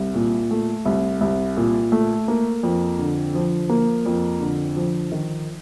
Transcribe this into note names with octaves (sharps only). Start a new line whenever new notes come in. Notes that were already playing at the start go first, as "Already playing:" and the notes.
Already playing: C2
A#2
A3
C2
C2
A#2
A3
A#3
F2
D3
F3
A#3
F2
D3
F3
D#3